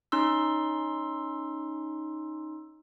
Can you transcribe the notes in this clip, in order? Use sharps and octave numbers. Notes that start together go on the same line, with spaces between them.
C#4 D#4 C6 E6